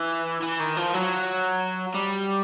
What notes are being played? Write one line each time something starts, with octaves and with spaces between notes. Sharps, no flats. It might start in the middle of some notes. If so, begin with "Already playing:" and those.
Already playing: E3
E3
D#3
F3
F#3
G3